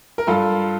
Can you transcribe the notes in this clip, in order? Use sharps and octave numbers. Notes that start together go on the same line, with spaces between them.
A#4
G2 F4 A4